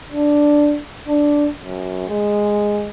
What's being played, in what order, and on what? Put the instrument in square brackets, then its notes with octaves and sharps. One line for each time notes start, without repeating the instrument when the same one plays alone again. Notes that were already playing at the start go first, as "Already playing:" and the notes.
[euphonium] D4
D4
F#2
G#3